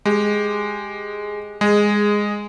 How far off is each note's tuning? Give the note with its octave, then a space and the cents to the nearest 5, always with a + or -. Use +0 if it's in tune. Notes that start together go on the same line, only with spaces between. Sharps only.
G#3 +0 G4 +10
G#3 -10 G#4 +0